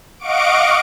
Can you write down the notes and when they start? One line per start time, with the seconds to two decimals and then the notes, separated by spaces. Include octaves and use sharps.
0.19 D#5 F5 F#5 C#6 D6 D7